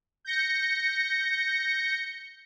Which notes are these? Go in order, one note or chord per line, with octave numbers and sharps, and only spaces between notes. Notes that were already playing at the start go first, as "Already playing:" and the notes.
G6 A#6 C#7